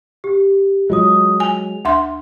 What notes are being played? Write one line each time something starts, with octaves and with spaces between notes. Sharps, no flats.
G4
F#3 G#3 F4 D#6
G#5 F7
D2 E5 C6